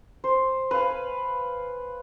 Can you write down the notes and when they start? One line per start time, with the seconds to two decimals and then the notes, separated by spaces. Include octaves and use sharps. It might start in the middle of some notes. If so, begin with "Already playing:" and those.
0.24 C5
0.71 B4 F5 G#5